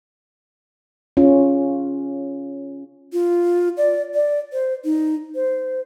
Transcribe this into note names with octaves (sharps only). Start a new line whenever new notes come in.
C#4 F4
F4
D5
D5
C5
D#4
C5